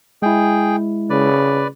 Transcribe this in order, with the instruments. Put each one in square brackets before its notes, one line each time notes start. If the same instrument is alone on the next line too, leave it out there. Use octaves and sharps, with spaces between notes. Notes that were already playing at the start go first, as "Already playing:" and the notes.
[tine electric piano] G#3 E4 [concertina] G#4 G5
[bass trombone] C#3 [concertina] B4 D5